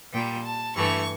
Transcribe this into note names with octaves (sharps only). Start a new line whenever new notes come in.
A#2 G3 G5
A5
G2 E3 A3 C#6